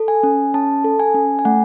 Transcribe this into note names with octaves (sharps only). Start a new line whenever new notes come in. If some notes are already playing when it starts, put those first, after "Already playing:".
Already playing: A4
G#5
C#4
C#4 A5
A4
G#5
C#4
G#5
A3 F#5